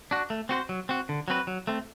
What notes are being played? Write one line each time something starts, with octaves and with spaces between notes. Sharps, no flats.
D4 F#4
A3
C4 F#4 C5
F#3
C4 F#4
D3
F#3 C4 F#4 B4
F#3
A3 C4